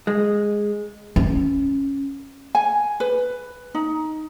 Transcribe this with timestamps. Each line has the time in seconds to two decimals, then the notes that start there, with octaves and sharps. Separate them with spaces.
0.07 G#3
1.16 C#4
2.55 G#5
3.00 B4
3.75 D#4